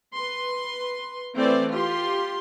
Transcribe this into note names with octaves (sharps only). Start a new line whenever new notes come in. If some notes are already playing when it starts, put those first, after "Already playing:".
B4 C6
E3 A3 C4 C5 D5
F4 G4 C6